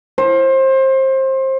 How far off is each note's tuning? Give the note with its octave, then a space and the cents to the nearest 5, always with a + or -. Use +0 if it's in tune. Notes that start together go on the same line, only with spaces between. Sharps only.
C5 +25